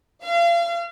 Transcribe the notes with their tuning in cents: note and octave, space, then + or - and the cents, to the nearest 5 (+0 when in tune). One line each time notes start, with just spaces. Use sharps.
F5 -35